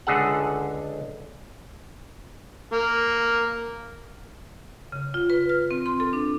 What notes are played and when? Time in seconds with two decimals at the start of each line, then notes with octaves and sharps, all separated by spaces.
0.07 C#2 D3 G#4 A4 F#5
2.72 A#3
4.92 C#3
5.14 F4
5.30 B4
5.49 F6
5.71 C4
5.86 C6
6.00 A4
6.13 D4